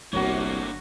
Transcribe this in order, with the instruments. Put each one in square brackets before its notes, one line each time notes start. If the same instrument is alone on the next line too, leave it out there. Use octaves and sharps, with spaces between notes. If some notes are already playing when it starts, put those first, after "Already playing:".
[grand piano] G1 [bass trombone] C2 [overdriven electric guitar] D3 A#3 [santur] F#4 A#4 C#5